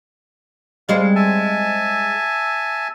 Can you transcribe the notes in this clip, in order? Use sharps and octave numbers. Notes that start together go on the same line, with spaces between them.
G3 G#3 C4 F5
E5 G#5 A5